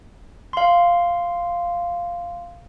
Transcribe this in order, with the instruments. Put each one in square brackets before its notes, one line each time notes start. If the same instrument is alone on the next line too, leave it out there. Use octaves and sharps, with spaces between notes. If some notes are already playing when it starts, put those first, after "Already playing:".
[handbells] F5 C6